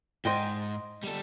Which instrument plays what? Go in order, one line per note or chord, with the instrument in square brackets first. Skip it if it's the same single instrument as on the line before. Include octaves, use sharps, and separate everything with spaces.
[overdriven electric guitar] G#2 [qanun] C5 D#5 G5
[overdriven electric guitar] G3 A4